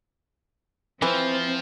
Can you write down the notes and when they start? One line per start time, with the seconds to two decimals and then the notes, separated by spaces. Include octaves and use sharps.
1.02 E3 F3 C4